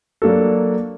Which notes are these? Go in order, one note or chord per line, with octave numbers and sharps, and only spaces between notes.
F#3 A#3 D4 F#4 A4